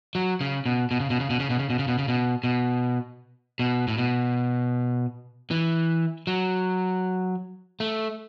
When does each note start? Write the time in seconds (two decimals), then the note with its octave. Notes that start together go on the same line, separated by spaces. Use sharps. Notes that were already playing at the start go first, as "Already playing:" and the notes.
0.15 F#3
0.41 C#3
0.66 B2
0.91 B2
1.00 C#3
1.10 B2
1.20 C#3
1.30 B2
1.40 C#3
1.50 B2
1.59 C#3
1.70 B2
1.79 C#3
1.88 B2
1.99 C#3
2.08 B2
2.44 B2
3.59 B2
3.88 A2
3.98 B2
5.51 E3
6.27 F#3
7.80 A3